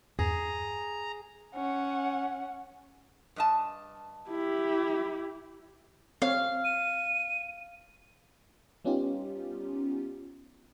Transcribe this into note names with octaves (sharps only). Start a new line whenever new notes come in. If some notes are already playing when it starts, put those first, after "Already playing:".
E2 G2 G#4 A#5
C#4 F#5
G2 D#5 A5
E4 G4
C4 C#5 F5
D#7
G3 B3 C#4 D#4 F4 G4